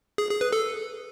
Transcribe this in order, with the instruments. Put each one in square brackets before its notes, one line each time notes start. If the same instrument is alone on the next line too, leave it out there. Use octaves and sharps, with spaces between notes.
[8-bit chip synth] G#4
G#4
B4
A4